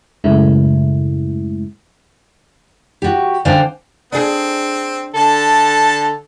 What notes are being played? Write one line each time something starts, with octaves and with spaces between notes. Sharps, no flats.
F#2 A2 C#3 G#3 A3 E4
F#4 G4
D3 D4 C5 F5 G5 G#5
C4 D4 G#4
D3 A4 A5